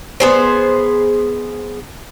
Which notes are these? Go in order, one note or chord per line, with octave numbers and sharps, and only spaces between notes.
B3 G#4 C5